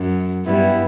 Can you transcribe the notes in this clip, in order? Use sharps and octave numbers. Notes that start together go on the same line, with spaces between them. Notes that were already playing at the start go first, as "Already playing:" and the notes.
Already playing: F#2
G2 G3 B3 E4